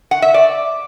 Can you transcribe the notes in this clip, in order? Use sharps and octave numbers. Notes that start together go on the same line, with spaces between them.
F#5
E5
D5